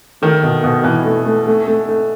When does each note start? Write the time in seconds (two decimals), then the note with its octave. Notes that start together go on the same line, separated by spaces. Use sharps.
0.22 D#3 A3
0.43 B2
0.64 B2
0.84 B2 E3
1.05 A3
1.26 A3
1.47 A3
1.68 A3
1.89 A3